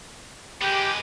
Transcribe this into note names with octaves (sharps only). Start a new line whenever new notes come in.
G#3 B3 G4